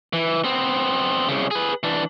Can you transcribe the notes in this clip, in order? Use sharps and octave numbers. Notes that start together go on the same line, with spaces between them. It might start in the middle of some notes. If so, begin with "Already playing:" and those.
E3
B3 C4
C2 C#3
G#4 B4
E3 D4